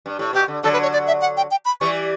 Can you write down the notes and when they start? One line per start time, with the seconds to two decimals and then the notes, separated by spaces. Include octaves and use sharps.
0.06 G2
0.19 A2
0.33 B2 G4
0.48 D3
0.63 D3 F#3 A4
0.73 B4
0.82 C#5
0.93 D5
1.07 E5
1.21 F#5
1.37 G5
1.51 G5
1.65 B5
1.81 E3 G3 C#6